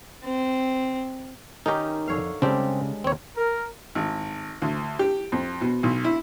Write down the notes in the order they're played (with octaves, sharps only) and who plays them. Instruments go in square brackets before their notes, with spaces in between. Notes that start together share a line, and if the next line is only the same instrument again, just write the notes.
[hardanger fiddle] C4
[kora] D#3 C#4 A#4 [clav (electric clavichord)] D#4 G4
[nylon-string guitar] F2 [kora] D3 C#5 F5
[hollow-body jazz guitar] C#3 [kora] G3 D4 [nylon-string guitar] G#3 C#5 G5 [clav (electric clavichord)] C4 G4
[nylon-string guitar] D#2 [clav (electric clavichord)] C4 C#5
[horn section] A#4
[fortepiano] G#1
D2
G4
F2
B2
B1
E4